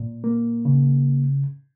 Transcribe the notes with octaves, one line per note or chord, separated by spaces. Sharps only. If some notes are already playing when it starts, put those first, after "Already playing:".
Already playing: A#2
A#3
C#3